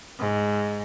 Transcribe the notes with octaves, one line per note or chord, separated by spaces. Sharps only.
G#2